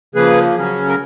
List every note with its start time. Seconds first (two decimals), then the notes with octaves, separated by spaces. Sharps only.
0.15 C#3 F3 A#3 G#4 B4
0.55 C#3 F#3 C#4
0.89 A#4